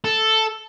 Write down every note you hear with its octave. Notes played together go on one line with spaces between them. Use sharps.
A4